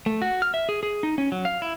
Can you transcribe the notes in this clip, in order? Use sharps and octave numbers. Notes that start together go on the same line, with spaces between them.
A3
F#4
F6
E5
G#4
G#4
D#4
C#4
F#3
F5
E4